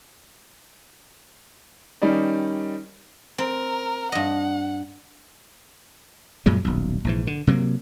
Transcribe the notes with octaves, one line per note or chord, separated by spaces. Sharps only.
D#3 G3 C#4 D#4 D5
C4 A#4
G2 D#5 F#5
F#2 A#2 F#3 G#3
D#1 B1
A#1 G#2 E3
D3
C3 F#3 A3 A#3